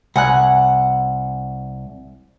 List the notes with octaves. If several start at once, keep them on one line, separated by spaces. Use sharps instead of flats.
C2 F#5 G#5 F#6